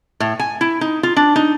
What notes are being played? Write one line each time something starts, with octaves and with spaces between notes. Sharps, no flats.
A2
G#5
E4
D#4
F4
D4
D#4